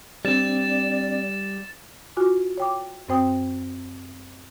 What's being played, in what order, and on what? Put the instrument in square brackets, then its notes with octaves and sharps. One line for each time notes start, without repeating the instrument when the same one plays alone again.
[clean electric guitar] G3 [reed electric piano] C4 D4 [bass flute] D5 [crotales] A6 E7
[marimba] F4 F#4 G#5 D6
C#5 G5 D6
F#2 C4 C5 G5 D#6